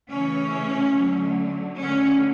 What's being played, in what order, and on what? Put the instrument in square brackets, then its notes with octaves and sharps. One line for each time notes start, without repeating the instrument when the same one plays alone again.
[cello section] C#3 E3 A3 C#4
D3 F#3 A3
D3 A3 C#4